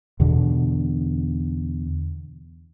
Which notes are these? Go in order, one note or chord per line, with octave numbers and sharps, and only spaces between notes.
E2 B2 D3